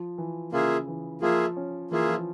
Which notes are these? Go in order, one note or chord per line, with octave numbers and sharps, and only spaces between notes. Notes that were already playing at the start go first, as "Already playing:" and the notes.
Already playing: F3
E3
C#3 A#3 F4 G#4 E5
E3
F3 A#3 F4 G#4 E5
C#4
E3 A#3 F4 G#4 E5
F3